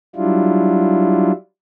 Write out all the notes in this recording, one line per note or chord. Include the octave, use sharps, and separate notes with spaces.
F#3 G3 D4 E4 F4